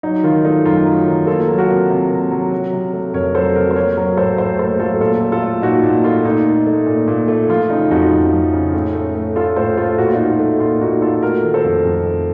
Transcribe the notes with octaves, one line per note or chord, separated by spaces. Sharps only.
F#3 D#4
D#3 F4
A3 D#4
F#2 F4
F#3
D#3
A#3 F4 A4
F#3
F#4 A#4
C3
C3
A#3
F#3
F#3
C3
A3
F2 A#4 C#5
F#3 A4 C5
C3 F#4 A#4
C5
A#3 A#4 C#5
F#3 A#4 C#5
A2 A4 C5
A2 A4 C5
A#3 A4 C5
F#3 F4 A4
A#2 F4 A4
A3
F4 A4
A3
A#2 D#4 F#4
A#2
A3 F4
A#2 D#4
A3
A3
A#2
A#2
A3
F3 F4
C#3 D#4
F2 D#4 F#4
F2
F3
C#3
A2
A3
A3
A2 F4 A4
A2 A4 C5
A3 F4 A4
A#2 F#4
F4
A3 D#4 F#4
A3
A#2 F4
A#2 D#4 F#4
A3 F4 A4
A3 F#4 A#4
D#3
A4 C5
F2
F2
A3